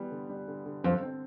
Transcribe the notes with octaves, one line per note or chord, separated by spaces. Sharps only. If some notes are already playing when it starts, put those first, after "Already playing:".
Already playing: E3 G3 B3
D3
G3
D3
D3
F2 C4
C4